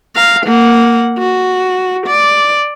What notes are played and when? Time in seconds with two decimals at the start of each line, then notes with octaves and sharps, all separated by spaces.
0.15 F5 A#5
0.45 A#3 F#5
1.18 F#4
2.06 D5